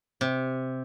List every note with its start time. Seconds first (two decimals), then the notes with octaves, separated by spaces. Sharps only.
0.21 C3